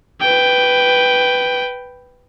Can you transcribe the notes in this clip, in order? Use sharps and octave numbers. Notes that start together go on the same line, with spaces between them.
B4 G5